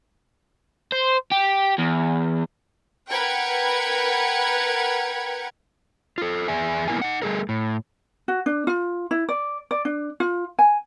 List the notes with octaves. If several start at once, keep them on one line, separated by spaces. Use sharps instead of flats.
C5
G4
E2
A#4 B4 F#5 G5 G#6 C#7
F4 A4
E2 G#4 E5 G#5
A#3 B3 E4 A#4 G#5
D#4 D#5 F#5
G3 A3 G#4 A#4
A2
F#4
D4
F4
E4
D5
D5
D4
F4
G#5